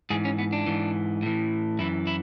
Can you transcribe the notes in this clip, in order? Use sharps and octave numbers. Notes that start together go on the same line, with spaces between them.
G#2 E3 G#4
C#4
B3
D4
G#2 E3
A2 E3
F#2 E3 E4
E4